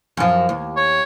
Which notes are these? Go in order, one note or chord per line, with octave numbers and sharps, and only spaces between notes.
F#2 F3
D#2
C#5